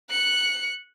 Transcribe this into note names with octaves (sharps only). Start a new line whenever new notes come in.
F#6 C#7